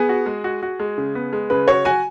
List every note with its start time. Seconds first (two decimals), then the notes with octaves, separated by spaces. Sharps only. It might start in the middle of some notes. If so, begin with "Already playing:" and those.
Already playing: B3 G#4
0.09 F#4
0.26 G#3
0.44 F#4
0.63 F#4
0.80 G#3
0.98 C#3
1.15 B3
1.33 G#3
1.50 C#3 B4
1.68 F#4 C#5
1.85 F#4 G#5